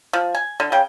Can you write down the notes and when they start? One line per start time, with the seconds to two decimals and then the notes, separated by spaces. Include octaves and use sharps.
0.13 F3
0.35 G#5
0.60 D3
0.72 C#3 G5